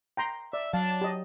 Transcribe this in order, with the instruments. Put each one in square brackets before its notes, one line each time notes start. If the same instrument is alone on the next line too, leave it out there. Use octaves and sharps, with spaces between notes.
[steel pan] G5 A#5 C6
[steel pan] D5 [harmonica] E5
[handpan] F#3 [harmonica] D4 A5 [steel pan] F5
[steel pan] G4 D#5